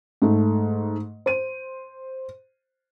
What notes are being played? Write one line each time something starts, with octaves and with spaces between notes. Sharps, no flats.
G#2 A3
C5 D#7